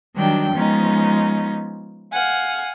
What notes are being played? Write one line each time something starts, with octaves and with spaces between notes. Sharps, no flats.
D#3 F#3 G3 D4 G5
F3 G#3 B3 C#4 D#4
F5 F#5 G#5